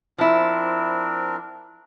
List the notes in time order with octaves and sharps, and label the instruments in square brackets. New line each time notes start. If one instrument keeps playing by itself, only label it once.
[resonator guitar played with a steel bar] F3 E4 [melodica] C4 D4 A#4